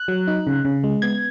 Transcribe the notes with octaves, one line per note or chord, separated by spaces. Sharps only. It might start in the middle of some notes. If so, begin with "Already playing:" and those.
Already playing: F#6
F#3
D#4
C#3
C#3
G#3
B3 G#6